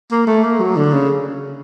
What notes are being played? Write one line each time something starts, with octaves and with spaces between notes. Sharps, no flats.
A#3
A3
A#3
F#3
D3
C#3